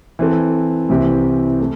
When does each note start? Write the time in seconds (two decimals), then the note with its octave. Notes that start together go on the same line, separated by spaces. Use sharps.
0.19 E3 C4 A4
0.89 C2 C3 E3 C4 G4
1.60 A3